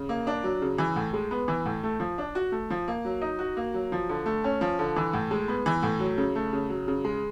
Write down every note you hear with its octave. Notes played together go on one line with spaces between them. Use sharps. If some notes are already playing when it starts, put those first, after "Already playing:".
Already playing: C#3
A#3
D4
F#3
C#3
E3
A2
G#3
B3
E3
A2
A3
F3
D4
F#4
A3
F3
A#3
F#3
D#4
F#4
A#3
F#3
F3
D3
A3
C#4
F3
D3
E3
A2
G#3
B3
E3
A2
F#3
C#3
A3
C#3
F#3
C#3
G#3